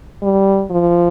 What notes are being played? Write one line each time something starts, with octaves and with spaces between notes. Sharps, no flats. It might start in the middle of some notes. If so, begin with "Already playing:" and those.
G3
F3